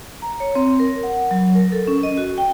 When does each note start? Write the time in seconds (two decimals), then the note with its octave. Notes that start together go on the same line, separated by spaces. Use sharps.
0.22 A#5
0.40 C#5
0.55 C4
0.79 A#4
1.03 F#5
1.31 F#3
1.55 A#4
1.72 A4
1.88 C#4
2.03 D#5
2.17 F#4
2.38 G5